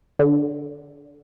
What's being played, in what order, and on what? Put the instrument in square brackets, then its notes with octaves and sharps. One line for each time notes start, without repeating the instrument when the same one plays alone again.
[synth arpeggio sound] D3